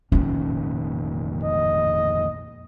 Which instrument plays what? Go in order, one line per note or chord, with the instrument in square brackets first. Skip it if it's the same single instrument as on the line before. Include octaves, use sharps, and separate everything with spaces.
[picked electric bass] F1 A#2 D#3 [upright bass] C#4 F4
[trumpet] D#5